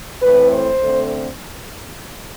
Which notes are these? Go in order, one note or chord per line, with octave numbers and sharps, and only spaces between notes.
A2 E3 A3 C4 B4
C5
D3 A3 C4